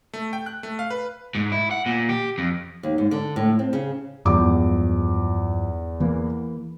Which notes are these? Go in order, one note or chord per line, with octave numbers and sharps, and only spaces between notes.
A3
G5
F#6
A3
F5
B4
G#2
E4
F#5
A#2
G4
F2
D#2
G#2
D3
A2
C4
C#3
E2 G2 F3 G#3 D6
E3 A#3